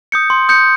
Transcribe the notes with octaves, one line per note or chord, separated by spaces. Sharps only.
D#6 G6 C#7
C6
D#6 G6 C#7